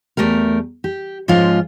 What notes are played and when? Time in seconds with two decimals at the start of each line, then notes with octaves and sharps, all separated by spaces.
0.17 E2 B2 A3 G4 A#4
0.84 G4
1.28 G#2 F3 G#3 C#4 F4